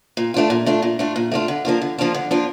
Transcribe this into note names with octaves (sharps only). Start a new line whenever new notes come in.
A#2
A3 D4 F4
A#2
A3 D4 F4
A#2
A3 D4 F4
A#2
A3 D4 F4
D3
F3 A#3 D4 F4
D3
F3 A#3 D4 F4
D3
F3 A#3 D4 F4